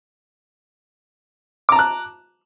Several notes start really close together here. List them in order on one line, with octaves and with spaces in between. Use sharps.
D6 A#5 A5 F#6